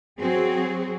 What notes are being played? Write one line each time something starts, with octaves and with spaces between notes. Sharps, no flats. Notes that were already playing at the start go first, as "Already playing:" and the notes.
F#3 C4 F#4 G#4